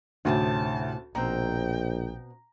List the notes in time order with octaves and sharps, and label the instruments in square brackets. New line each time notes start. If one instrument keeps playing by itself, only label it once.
[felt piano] D2 [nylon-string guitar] A2 C3 D#4 [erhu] A5
[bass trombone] A#1 [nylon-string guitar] B2 C4 [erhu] G5 [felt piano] A#5